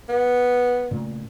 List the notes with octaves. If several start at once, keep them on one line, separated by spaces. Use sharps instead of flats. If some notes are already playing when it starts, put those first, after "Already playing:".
B3
A#2 C#3 A3